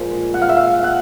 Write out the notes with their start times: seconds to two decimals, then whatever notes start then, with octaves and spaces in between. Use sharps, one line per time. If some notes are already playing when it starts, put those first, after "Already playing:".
Already playing: A#2 F3 G#3
0.34 F#5
0.42 F5
0.49 E5
0.57 F5
0.83 F#5